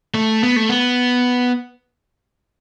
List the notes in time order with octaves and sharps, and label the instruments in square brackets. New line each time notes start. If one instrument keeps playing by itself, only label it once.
[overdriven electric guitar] A3
B3
A3
B3